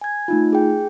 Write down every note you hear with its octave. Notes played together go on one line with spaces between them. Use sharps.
G#5 G#6
A3 D#4 F4
G#4 G5